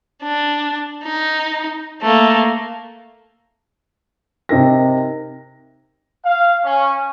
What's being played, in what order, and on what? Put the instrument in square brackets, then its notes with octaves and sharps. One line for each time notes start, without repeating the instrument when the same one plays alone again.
[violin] D4
D#4
A3 A#3
[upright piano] C3 D#4 A#4 A#6
[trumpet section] F5
C#4